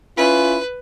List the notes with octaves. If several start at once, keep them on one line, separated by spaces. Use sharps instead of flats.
C#4 E4 F4 B4